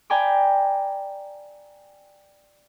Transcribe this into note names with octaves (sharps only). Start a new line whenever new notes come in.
D5 G5 G#5 A#5 B5 D6